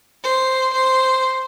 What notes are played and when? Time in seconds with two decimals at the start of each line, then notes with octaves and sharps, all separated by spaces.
0.23 C5
0.73 C5